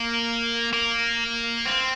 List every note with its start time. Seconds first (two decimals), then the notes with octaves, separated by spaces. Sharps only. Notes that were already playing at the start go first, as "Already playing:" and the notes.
Already playing: A#3
0.73 A#3
1.65 C4